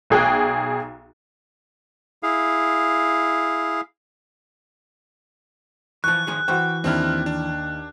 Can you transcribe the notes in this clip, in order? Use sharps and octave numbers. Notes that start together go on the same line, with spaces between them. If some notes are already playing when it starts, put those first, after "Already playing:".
B1 G#4 G5 F#6
E4 G#4 F5
E3 F3 C#6 F#6
D#3 F3 G#4
E3 F#4 C5 G5 C#6
D#2 C4 D4 E4 F6
D4